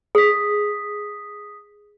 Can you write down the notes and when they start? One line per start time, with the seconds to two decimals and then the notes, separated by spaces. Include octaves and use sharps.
0.15 G#4 D#6 B6